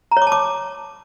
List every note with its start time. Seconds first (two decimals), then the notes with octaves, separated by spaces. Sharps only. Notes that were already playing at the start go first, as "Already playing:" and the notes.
0.12 A#5
0.17 C#5
0.22 D6
0.27 A5
0.32 D6